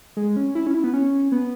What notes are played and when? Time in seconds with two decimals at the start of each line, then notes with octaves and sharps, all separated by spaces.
0.17 G#3
0.36 C#4
0.55 E4
0.67 C#4
0.74 E4
0.84 B3
0.93 C#4
1.32 B3